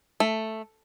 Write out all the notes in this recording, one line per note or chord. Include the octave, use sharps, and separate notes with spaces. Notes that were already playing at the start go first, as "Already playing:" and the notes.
A3